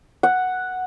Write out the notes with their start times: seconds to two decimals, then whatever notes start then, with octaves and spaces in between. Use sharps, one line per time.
0.23 F#5